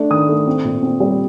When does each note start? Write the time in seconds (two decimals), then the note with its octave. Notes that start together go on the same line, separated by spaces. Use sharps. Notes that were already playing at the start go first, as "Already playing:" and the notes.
Already playing: A3 D4
0.11 D#3 D#6
0.29 A3
0.47 C4
0.65 A#2
0.83 C4
1.00 G3